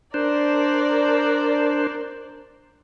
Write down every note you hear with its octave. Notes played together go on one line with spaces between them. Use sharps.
D4 A#4 C5 D5